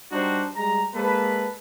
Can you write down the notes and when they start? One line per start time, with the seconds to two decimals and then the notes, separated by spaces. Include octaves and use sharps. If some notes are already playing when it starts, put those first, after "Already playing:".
0.12 G3 D4 D#4 F#4 C5
0.56 G3 G#3 A#5
0.95 G#3 A#3 A4 B4